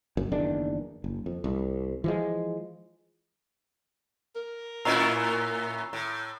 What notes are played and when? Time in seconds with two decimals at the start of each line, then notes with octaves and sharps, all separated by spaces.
0.17 F#1 F#2
0.32 F#1 E2 D#3 D4
1.04 F#1
1.26 F2
1.44 C2
2.04 E3 F3 G#3
4.36 A#4
4.85 A2 C#4 E4 A#5 E6 C7
5.93 A2